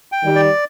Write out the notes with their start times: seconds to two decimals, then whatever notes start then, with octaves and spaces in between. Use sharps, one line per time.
0.12 G5
0.24 D#3 G3
0.36 D5